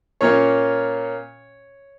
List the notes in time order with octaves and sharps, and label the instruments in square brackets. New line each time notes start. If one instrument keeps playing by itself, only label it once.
[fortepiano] A#2 A#3 C#4 C#5